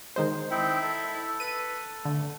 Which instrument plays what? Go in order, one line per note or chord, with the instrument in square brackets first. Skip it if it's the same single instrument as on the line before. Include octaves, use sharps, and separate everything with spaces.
[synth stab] D#3 G#3 C5
[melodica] C4 D#4 G5 [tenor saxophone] E4
[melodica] A4
[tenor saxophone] B4 [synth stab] D#7
[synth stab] D3 [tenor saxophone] A3